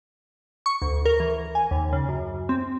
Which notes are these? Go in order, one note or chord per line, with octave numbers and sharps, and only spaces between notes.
C#6
D2
A#4
E3
G#5
D#2
C#3
F#2
C4